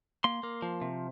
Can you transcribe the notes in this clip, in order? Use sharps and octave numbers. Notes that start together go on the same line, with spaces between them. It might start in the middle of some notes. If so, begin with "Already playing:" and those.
A#3 C6
A#3
F3
C3